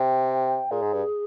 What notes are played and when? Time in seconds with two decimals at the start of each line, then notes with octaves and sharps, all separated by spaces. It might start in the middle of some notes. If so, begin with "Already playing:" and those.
Already playing: C3 G5
0.71 A#2 G#4
0.82 G#2
0.93 G2